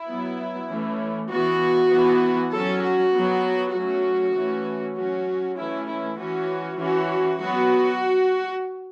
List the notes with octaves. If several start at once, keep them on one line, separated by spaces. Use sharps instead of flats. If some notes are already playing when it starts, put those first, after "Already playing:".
Already playing: E4
F#3 B3
E3 A3 C#4
E3 B3 F#4
E3 B3
F#3 C#4 A4
F#4
F#3 B3
F#3 A3 C#4 F#4
E3 A3 C#4
F#3 C#4 F#4
E3 A3 C#4 E4
E4
E3 C#4 F#4
E3 C#4 F#4
F#3 B3 F#4